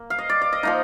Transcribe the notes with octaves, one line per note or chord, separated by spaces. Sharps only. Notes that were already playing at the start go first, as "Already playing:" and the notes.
Already playing: A#3
F5
D#5
D5
D5
D#5
F3 A#3 D#4 F5